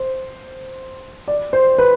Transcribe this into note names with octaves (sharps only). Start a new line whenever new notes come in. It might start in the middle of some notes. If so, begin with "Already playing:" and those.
Already playing: C5
D5
C5
B4